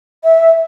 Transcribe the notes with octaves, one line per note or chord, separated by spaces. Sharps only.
E5